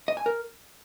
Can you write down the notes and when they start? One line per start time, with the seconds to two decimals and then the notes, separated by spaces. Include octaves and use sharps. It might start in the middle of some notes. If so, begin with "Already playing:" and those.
0.08 D#5
0.17 G#5
0.26 A#4